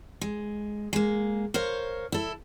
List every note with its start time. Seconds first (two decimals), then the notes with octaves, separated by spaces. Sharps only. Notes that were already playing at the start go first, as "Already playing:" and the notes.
0.21 G#3
0.93 G#3 A#3
1.54 A#4 C5 C#5 F5
2.12 E4 A4